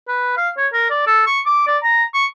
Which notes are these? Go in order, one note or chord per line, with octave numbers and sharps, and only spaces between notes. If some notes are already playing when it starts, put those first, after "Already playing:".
B4
F5
C#5
A#4
D5
A4
C#6
D6
D5
A#5
C#6